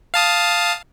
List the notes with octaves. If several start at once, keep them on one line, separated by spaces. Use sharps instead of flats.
F5 A5 D#6